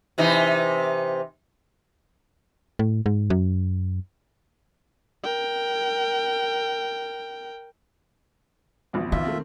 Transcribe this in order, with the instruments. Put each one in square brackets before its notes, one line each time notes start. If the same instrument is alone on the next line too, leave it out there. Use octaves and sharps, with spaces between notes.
[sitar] C3 E3 D#4
[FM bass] A2
G#2
F#2
[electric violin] A#4 G5
[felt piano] A1 F2 B2
[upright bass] D#3 [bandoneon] F4 E5
[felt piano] A3 A#3 C4